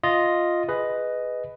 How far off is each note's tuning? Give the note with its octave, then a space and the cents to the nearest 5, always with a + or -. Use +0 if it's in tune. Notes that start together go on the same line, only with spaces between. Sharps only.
F4 +0 D#5 +0
G#4 +0 B4 +10 D#5 +0